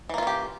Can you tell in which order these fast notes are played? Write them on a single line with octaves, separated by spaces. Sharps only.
E3 A#3 F4 C#4 G4